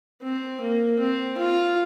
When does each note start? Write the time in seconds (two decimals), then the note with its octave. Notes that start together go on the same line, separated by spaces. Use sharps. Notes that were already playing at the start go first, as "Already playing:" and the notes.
0.23 C4
0.61 A#3
0.99 C4
1.38 F4